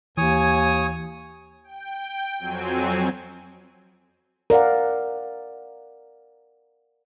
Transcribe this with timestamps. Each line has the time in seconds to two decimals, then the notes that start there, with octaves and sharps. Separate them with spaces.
0.17 D#2 E3 C#5 G#5 D#6
1.64 G5
2.38 F2 F#3 C4 G#5
4.50 A#4 D5 F5 F#5